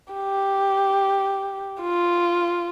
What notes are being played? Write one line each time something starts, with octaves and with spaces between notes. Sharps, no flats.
G4
F4